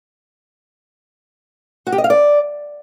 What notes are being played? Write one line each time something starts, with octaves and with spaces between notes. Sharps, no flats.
F#4
G4
D#5
F5
D5